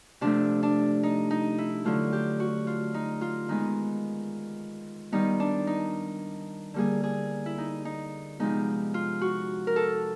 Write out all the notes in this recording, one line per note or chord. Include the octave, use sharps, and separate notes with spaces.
C3 F3 A3 D4
D4
D#4
D#4
E4
D3 F#3 A3 F4
G4
F#4
F4
D#4
F4
D#3 G#3 B3 D#4
D#3 G3 B3 D#4
D4
D#4
D3 G3 A#3 G#4
G#4
E4
D#4
D#4
C3 F3 G#3 B3 D#4
F4
F#4
A#4
A4